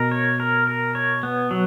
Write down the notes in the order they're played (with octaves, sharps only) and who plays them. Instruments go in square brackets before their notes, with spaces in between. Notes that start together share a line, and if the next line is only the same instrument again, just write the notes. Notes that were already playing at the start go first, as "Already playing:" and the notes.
Already playing: [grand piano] B2 [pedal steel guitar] A#4
[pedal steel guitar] C#5
A#4
A#4
C#5
B3
F#3